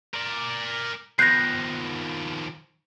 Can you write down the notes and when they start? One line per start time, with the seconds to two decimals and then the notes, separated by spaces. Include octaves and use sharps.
0.14 A#4 D5
1.19 D#3 F3 B3 F#6 G6 A#6 C7